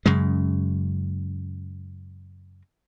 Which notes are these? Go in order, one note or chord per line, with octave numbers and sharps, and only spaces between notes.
F#2 C#3 G#3